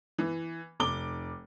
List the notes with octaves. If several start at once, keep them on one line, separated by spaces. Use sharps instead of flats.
E3
F1 D6 G7